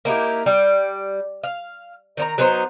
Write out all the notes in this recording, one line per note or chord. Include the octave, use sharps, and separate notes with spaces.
A#3 D#4 E4 G4
G3
F5
D#3 C#5 A#5
F#3 B3 D#4 C5